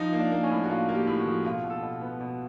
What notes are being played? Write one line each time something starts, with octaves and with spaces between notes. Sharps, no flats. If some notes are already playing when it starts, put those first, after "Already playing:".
Already playing: F3 D#4
A#3
D4
A#3
C#4
A2
F#4
A#3 F4
A#3
G4
A2
F#4
F3
B2 F4
B2
A4
B2
B3
B2